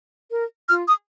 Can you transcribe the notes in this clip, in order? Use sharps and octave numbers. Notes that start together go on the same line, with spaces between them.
A#4
F4 F6
D#6